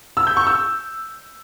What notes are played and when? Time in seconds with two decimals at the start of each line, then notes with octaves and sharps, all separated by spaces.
0.17 E6
0.27 G6
0.37 C#6
0.47 E6